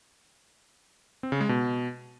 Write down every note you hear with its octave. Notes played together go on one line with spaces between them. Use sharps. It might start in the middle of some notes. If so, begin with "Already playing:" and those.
C4
C#3
G#3
B2